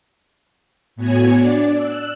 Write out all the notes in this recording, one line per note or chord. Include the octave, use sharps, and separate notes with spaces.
A2 B3 F#4 C#5 G#5 G#6
D4 D5
E6 F#6